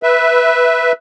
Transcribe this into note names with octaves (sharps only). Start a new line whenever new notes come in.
B4 E5